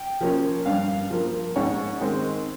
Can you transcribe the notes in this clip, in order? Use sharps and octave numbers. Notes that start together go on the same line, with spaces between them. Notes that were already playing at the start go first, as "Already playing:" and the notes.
Already playing: G5
F3 A#3 C#4
G2 F5
F3 A#3
G#2 C#5
D#3 G#3 C4